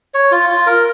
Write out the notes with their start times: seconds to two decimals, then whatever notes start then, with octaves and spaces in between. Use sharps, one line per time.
0.14 C#5
0.31 F4
0.49 F4
0.67 A#4